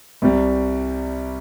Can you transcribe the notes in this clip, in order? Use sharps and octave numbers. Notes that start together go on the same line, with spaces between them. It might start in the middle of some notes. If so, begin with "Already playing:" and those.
C2 C3 G3